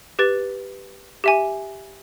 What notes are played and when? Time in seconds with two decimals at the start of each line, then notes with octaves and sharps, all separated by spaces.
0.19 G4 B4 A6
1.24 G4 E5 G#5